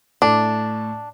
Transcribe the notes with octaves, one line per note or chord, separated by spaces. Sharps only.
A2 D4 A5